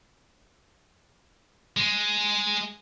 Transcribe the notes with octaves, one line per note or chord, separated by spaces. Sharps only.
G#3